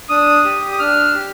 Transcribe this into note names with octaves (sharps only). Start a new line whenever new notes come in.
D4 D#6
G4
D#6
D4 F6
G4